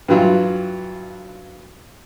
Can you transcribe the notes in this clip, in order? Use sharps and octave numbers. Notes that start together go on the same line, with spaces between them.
G2 E3 F#3 F4